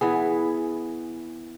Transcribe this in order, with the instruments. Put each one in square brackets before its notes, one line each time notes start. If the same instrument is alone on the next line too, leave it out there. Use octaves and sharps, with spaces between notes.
[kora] E3 B3 G#4